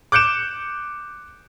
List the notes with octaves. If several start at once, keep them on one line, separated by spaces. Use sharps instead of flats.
D6 F#6 G6 C#7 D7 E7